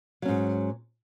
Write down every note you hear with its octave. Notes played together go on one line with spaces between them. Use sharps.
G#2 F#3 C#4